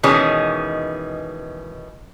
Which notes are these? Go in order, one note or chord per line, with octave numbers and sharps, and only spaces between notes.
B2 D#3 E3 G#3 C#4